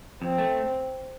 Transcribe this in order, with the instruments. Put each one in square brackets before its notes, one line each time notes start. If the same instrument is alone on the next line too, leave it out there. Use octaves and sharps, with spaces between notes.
[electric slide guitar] F2 [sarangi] C4
[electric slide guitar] A3